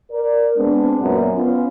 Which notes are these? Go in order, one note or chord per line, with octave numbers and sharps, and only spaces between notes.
A#4 D5
G#3 B3 C4 D4
F#2 A#2 F#3 B3
B3 C#4 F4 C5